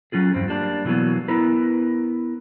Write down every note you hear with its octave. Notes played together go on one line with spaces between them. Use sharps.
F#3 C#4 F4 G#4
E2 G2 C4
G3 A#3 D4
B2 E3 F#3 A#3 B3
B3 E4 A#4 B4